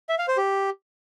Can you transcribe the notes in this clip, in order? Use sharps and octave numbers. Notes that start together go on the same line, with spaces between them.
E5
F5
C5
G4